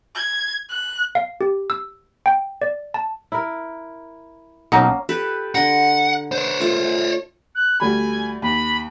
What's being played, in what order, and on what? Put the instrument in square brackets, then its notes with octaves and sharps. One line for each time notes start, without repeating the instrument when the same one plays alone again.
[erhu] G#6
F#6
[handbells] F5
G4
E6
G5
D5
A5
[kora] E4 A#4
[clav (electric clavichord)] B1 D#4 A#5 [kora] A#3 C#4 [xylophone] F#5
[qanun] G4 A4 B4
[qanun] D3 A#5 [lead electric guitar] F#5
[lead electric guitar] C5 C#5
[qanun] A3 F4
[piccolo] F#6
[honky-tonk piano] D2 G3 B5 [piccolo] G#5
[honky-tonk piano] D#2 [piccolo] B5